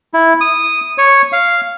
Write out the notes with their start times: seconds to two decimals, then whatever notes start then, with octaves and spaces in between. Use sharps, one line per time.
0.14 E4
0.41 D#6
0.98 C#5
1.32 F5